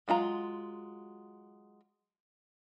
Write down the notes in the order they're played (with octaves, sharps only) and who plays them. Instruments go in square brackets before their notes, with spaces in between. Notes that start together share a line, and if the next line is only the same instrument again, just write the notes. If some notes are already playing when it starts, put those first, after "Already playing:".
[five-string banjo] F#3 G#3 F4 A#5